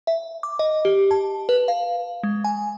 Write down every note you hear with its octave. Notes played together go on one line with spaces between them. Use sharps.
E5
D6
D#5
G4
A5
B4
F5
G#3
G#5